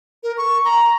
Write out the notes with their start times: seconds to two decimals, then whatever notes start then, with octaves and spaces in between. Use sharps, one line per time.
0.23 A#4
0.38 C#6
0.65 A#5